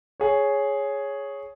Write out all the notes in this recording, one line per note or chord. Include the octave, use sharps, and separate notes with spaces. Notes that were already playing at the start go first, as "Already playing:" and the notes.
G#4 C#5